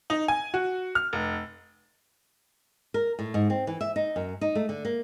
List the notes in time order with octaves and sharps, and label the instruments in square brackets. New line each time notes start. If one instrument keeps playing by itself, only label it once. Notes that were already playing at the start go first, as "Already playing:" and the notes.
[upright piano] D#4
G#5
F#4
F6
F1
[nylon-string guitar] A#4
A2
G#2
C4
E3
E5
D#4
F#2
D#4
A3
D3
A#3